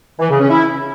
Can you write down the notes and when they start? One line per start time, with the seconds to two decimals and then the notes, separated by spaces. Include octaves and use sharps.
0.19 E3
0.30 C#3
0.40 C#4
0.50 E4